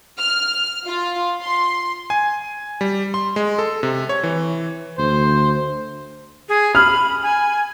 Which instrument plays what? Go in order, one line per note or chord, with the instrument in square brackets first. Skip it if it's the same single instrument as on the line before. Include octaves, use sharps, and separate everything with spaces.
[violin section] F6
F4
C6
[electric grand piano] G#5
G3
C6
G#3
A4
C3
C#5
E3
[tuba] D2 [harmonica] C5
[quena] G#4
[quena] B5 [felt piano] F6
[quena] G#5